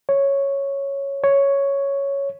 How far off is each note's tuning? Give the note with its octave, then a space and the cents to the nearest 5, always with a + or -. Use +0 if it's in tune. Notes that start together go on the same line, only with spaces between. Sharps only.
C#5 +0
C#5 +5